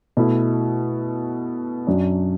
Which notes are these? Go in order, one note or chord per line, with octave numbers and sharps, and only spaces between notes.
B2 A3 E4
F#2 F#3 D4